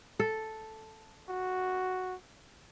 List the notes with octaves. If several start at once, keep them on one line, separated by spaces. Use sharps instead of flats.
A4
F#4